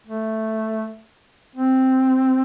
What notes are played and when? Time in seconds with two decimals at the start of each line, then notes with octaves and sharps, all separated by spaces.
0.07 A3
1.55 C4